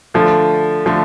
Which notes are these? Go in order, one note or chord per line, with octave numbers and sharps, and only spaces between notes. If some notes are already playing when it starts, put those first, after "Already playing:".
D3 F3 A3
D3 F3 A3